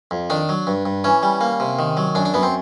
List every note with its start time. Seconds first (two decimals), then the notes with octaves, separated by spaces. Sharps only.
0.11 F2
0.30 D#3 D4
0.49 F#3
0.67 G2
0.86 G2
1.04 E3 C#4
1.23 G3
1.41 A#3
1.60 C3
1.79 D#3
1.97 F#3
2.15 F#2 D4
2.25 D4
2.34 F#2 B3
2.43 C4